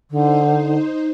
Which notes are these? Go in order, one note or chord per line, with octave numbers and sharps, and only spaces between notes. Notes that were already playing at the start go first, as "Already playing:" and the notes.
D3 D#4 C5